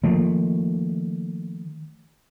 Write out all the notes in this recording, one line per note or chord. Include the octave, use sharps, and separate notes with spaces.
D#3 F3 A3 A#3